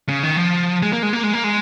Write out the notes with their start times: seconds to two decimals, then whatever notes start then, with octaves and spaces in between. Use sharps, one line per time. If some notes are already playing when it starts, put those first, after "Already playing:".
0.09 C#3
0.23 D#3
0.36 F3
0.83 G#3
0.93 A#3
1.03 G#3
1.13 A#3
1.23 G#3
1.33 A#3
1.44 G#3